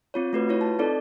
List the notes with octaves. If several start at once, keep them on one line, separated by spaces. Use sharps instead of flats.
C4 F4 C#5
A3 F#4 B4
E4 F4 B4 C#5
A5
C4 D#4 A4 D5